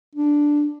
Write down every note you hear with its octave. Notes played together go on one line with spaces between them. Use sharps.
D4